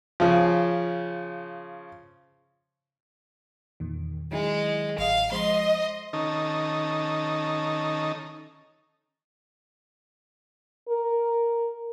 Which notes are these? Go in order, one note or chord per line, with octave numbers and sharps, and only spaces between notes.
C#3 F3
E2 A#2 D#3
D#3 F#3 G#3 E4
A1 D#5 F5
F3 G#3 C5 D#5 C6
D#3 C#4 D#4 A4
A#4